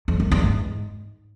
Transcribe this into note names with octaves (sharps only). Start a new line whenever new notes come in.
F2
F#2
E2
G#2